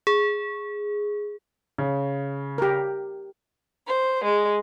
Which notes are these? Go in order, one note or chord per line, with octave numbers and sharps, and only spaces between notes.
G#4
C#3
G4 A#4
C5
G#3